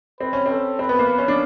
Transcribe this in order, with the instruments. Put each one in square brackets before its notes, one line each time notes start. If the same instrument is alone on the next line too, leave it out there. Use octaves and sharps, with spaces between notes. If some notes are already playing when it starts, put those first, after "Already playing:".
[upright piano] C4 [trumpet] B4
[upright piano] C#4
[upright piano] C4 [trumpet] A4
[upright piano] C4 [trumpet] B4
[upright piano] B3
A#3
[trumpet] B4
[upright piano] C#4
D4